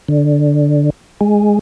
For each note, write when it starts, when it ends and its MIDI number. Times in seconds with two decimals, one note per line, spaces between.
0.08 0.90 50
1.21 1.59 56